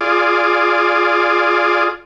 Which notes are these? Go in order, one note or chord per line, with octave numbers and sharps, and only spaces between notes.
F4 G#4 D5